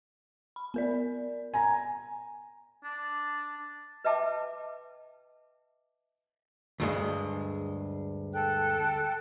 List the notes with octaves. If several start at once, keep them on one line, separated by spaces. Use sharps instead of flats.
B5
B3 A#4 D5
G#5 A#5
D4
B4 D#5 E5 G5 A5 D6
D2 G2 G#3
A4 G5 F#6